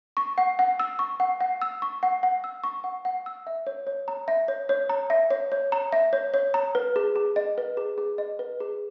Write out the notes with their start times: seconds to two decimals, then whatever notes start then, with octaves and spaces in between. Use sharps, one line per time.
0.17 C#6
0.38 F#5
0.59 F#5
0.80 E6
0.99 C#6
1.20 F#5
1.41 F#5
1.62 E6
1.82 C#6
2.03 F#5
2.23 F#5
2.44 E6
2.64 C#6
2.84 F#5
3.05 F#5
3.26 E6
3.47 E5
3.67 C#5
3.87 C#5
4.08 A#5
4.28 E5
4.48 C#5
4.69 C#5
4.89 A#5
5.10 E5
5.31 C#5
5.52 C#5
5.72 A#5
5.92 E5
6.13 C#5
6.34 C#5
6.54 A#5
6.75 B4
6.96 G#4
7.16 G#4
7.36 D#5
7.58 B4
7.77 G#4
7.98 G#4
8.18 D#5
8.39 B4
8.60 G#4